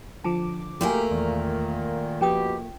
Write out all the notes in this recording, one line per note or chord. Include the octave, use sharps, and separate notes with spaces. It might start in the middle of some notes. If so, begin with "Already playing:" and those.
D3 F3 A5 D6
A3 A#3 F#4 G4 A#4 G#5
E2 A#2 D#3
B2 F3 C#4 G4 G5 D#6